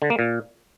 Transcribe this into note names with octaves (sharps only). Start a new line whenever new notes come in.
D3
A#3
A#2